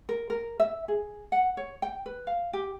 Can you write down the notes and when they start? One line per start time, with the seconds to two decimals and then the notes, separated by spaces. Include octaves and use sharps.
0.09 A#4
0.30 A#4
0.60 E5
0.88 G#4
1.32 F#5
1.57 C#5
1.82 G5
2.06 B4
2.27 F5
2.53 G4